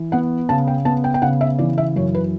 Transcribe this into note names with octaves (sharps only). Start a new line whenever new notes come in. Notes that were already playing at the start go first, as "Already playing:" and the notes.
Already playing: E3
B3 F#5
C#3 A5
G5
B3 A5
G5
G5
C#3 F#5
E5
E3 D5
E5
F#2 C#5
B4